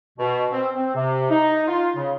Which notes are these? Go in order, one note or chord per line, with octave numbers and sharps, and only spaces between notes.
B2
C4
C4
C3
D#4
F4
C#3